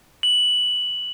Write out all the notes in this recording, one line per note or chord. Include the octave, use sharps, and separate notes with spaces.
F#7